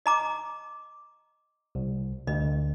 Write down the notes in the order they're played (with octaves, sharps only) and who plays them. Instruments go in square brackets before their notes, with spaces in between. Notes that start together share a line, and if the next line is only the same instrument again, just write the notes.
[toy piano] D#5 A#5 D6
[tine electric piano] C2
[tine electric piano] D2 [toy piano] D#5